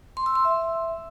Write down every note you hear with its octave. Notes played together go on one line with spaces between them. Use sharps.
C6
E6
C6
E5